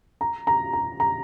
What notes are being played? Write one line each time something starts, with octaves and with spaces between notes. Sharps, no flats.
A#5
A#5
A#5
A#5